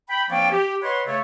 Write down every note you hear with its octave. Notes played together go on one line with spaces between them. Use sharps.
G5 B5
F3 A#3 C4 D4 C#5 G5
G4
B4 C#5 D#5 F#5 B5 C6
C#3 A3 C#5